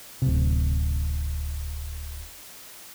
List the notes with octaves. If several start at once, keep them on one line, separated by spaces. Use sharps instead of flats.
D1 C3